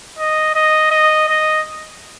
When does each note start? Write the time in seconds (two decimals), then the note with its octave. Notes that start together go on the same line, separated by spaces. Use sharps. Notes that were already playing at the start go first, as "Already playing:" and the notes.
0.19 D#5
0.55 D#5
0.91 D#5
1.28 D#5